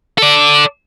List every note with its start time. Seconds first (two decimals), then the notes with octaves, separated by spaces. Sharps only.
0.18 A4 D5